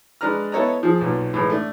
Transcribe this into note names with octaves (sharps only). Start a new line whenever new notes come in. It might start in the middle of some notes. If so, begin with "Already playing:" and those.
G#3 D4 B4 A#5 F6
B3 E4 A4 C#5 D#5 A#5
F3 G#4
B1 A#2
A2 E3 G#3
A3 D4